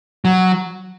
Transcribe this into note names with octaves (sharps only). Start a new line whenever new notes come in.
F#3